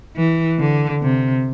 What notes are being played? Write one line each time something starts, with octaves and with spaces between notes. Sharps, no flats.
E3
D3
C3